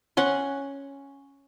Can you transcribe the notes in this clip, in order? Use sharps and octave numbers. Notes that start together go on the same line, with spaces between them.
C#4 F#5 C6